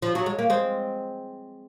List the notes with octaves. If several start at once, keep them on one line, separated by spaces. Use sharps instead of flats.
F3
F#3
G#3
A#3
G#3 C4